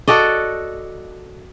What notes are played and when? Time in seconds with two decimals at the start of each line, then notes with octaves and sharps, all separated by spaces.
0.08 F#4 A4 D5 D#5